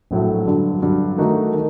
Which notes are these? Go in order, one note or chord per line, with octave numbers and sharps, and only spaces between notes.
A#1 A2 F#3 A3
G2 D3 F#3
G2 D3 F#3
D#3 A3 D#4 F#4
D#3